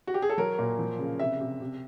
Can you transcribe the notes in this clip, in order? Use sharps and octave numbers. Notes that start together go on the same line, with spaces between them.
F#4
G4
G#4
A4
F#3 A#4
A#2
F3
C#3
C3 E5
C3
C3